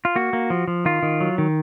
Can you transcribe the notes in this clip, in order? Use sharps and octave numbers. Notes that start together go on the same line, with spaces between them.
F4
A#3 F#4
A#3
F3
F3
D#3 F4
D#3
F#3
D#3